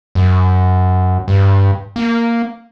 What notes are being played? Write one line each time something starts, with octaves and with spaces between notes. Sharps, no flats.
F#2
G2
A#3